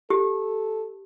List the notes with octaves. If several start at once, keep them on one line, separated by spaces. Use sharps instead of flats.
G4 A4